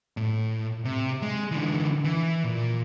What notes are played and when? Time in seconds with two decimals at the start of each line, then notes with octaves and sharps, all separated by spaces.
0.17 A2
0.85 C3
1.22 G#3
1.51 D3 E3
2.05 E3
2.44 A#2